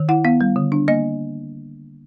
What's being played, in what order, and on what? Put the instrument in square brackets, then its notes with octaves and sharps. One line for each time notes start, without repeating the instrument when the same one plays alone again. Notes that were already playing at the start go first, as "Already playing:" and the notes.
Already playing: [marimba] D#3
E4 F#5
B3 F5
G3
D3
D4
A#3 D#5